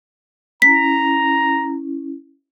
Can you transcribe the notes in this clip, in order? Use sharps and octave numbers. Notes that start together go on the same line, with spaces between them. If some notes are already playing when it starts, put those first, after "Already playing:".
C#4 E4 A#5 B6